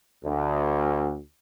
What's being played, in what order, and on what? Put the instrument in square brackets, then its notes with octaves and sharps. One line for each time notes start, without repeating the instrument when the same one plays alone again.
[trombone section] D2